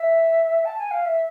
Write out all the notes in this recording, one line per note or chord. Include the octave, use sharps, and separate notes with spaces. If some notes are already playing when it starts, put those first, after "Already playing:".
Already playing: E5
A5
G#5
F5
E5